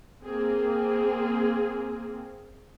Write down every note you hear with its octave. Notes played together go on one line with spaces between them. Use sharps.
A#3 C4 G#4